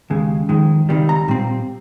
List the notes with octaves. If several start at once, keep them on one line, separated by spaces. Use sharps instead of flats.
D#2 C#3 G#3
F2 D#3 G#3
C#2 C3 D#3 G3
A#5
A#2 G3 C4